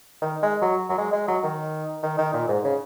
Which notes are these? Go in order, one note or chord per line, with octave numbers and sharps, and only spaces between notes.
D#3
G#3
F#3
F#3
G#3
G#3
F#3
D#3
D#3
D#3
A#2
G#2
C#3